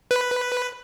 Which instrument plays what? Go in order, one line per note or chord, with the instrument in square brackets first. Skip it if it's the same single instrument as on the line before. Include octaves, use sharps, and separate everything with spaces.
[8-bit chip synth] B4